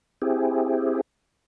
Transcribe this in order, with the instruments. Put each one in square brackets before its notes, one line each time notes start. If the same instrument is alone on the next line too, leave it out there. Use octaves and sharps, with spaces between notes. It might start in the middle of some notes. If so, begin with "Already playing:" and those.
[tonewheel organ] C4 E4 G4 G#4